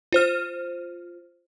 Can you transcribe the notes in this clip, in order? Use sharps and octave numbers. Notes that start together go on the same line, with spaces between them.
F4 C5 F6